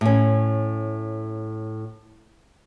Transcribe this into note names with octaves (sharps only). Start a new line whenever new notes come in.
A2 C#4